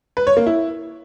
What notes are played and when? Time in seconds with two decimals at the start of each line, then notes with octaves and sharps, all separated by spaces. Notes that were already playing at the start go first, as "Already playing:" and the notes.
0.17 B4
0.27 C#5
0.37 A#3
0.47 E4